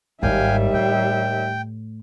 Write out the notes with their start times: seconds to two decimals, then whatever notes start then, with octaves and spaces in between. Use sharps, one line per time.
0.23 G#1 D#2 G#2 G3 E5 F5 G5 G#5
0.74 A2 G5